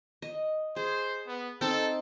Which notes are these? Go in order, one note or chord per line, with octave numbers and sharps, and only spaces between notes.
D#5
G#4 C5
B3
C4 D#4 A4